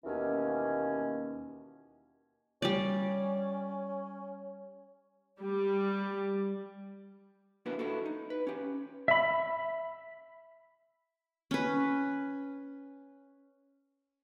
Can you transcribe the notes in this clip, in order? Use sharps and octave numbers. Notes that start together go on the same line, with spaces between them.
D#2 B2 E3 A#3 C#4
G3 C#4 D5
G3
A#3 B3 D4 E4 F#4 B4
D4 E4 F#4 A4
D#4
B4
C#4 G4
E5 B5
C#4 B4